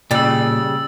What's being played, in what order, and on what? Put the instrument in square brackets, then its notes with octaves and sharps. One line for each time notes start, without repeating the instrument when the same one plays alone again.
[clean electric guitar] A#2 [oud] C#3 G3 [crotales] E6 A6